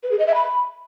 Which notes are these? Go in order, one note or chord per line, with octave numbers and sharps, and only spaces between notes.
B4
G#4
D#5
E5
B5